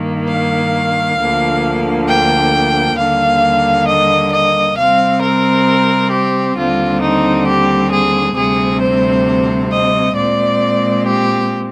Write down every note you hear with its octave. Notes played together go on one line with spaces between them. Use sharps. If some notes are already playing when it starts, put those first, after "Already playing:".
Already playing: G2 D#3 A#3
F5
D2 D3 F3 A#3
G5
D#2 D3 G3 A#3 F5
D#5
D#5
C3 G3 C4 F5
A#4
G4
D#2 D3 G3 C4 F4
D#4
G4
G#4
D2 C3 G3 C4 G#4
C5
D#5
A#2 G#3 C4 D5
G4